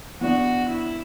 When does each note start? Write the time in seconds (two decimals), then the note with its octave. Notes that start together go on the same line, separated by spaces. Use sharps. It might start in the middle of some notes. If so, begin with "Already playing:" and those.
0.21 E3 B3 D4 F#4
0.69 E4